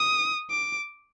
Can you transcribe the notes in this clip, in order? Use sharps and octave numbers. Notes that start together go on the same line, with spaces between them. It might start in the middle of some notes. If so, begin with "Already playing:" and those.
Already playing: D#6
D6